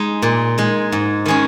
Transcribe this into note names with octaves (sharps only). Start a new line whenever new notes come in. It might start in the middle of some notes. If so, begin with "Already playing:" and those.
Already playing: G#3 D#4
A#2
G#3 D#4
G#2
D#3 G#3 C#4 G#4